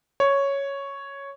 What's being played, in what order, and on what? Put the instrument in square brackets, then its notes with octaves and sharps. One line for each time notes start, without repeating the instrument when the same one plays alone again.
[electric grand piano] C#5